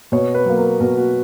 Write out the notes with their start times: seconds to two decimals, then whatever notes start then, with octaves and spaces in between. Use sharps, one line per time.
0.12 B2 C#5
0.34 B4
0.46 F#3 A#3
0.58 A#4
0.80 B2 A#4
0.97 F#4